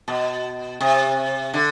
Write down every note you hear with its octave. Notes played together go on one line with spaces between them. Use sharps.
B2
C3
D3